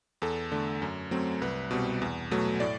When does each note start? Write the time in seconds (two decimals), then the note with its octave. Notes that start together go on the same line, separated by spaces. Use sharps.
0.22 E2 A4
0.52 D3 A3
0.82 F#2
1.11 F#3 A3 C4
1.42 C2 B4
1.71 B2 G3 C4
2.02 E2
2.31 B2 F#3 A3
2.60 A2 D5